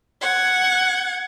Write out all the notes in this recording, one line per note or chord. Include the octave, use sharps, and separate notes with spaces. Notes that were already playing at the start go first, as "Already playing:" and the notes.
F#5 G#6